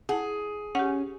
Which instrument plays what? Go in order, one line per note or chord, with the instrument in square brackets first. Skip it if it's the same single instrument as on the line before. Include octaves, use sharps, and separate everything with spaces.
[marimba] E4 F#5 [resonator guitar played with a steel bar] G#4
[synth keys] C#4 [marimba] G4 F#5